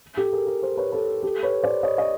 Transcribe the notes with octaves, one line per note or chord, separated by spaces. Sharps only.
G4 A4
G#4 A#4
G#4 A#4
A#4 C5
B4 C#5
A4 B4
G4 A4
B4 C#5
C5 D5
C#5 D#5
C#5 D#5